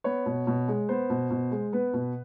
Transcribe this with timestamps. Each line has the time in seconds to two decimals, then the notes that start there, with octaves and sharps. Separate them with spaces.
0.04 B3 C#5
0.26 B2
0.47 B2
0.68 G#3
0.89 B3 C5
1.10 B2
1.30 B2
1.51 G#3
1.73 B3 B4
1.93 B2